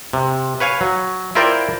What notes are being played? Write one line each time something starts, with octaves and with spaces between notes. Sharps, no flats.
C3
B4 C#5 F5 G#5
F#3
E4 F4 A#4 C5 D5 G5